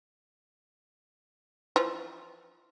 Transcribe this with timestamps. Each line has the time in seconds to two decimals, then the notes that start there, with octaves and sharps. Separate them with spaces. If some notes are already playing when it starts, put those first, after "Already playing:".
1.76 E3 F3 F4